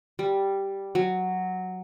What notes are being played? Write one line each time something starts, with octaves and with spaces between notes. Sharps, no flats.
G3
F#3